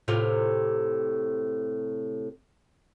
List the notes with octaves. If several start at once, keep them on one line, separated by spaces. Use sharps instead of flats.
A2 C3 F4